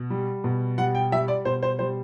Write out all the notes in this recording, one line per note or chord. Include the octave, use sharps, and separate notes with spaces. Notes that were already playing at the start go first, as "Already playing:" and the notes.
Already playing: B2
G3
B2
G3 F#5
G5
G3 E5
D5
B2 C5
C5
G3 C5